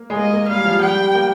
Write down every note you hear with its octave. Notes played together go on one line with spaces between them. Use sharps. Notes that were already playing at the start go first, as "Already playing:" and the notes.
Already playing: A#3
G#3
A#3 D#5
A#3
G3 F5
F3
G3 G5
A#3